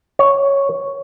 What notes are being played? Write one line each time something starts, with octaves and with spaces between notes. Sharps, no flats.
C#5